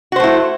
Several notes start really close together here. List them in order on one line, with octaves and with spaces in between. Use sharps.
F#4 C5 A3 E4